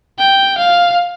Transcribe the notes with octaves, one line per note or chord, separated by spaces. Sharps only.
G5
F5